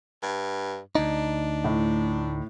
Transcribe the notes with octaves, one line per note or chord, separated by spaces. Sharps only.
G2
D2 D4 D#4
A2